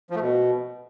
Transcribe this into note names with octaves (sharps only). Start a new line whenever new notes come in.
F3
A3
B2